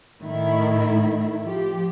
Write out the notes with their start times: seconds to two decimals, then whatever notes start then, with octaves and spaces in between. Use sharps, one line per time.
0.22 A2 D#3 A3 E4
1.45 F3 G4